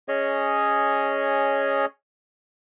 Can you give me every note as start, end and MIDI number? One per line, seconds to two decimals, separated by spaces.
0.08 1.86 61
0.08 1.86 68
0.08 1.86 73
0.08 1.86 75